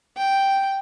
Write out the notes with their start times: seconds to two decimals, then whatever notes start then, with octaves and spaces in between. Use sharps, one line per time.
0.17 G5